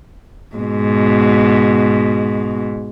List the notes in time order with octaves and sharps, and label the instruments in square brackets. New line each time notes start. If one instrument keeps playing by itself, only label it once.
[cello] G#2 B2